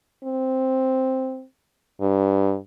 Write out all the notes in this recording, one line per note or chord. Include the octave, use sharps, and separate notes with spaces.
C4
G2